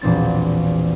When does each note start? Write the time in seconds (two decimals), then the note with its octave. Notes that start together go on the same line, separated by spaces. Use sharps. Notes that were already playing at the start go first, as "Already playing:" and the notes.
0.01 E1 A#1 C4 A6